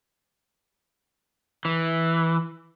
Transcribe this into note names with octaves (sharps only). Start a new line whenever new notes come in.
E3